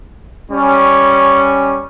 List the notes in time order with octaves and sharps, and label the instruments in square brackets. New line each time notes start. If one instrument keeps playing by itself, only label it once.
[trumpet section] G3 C#4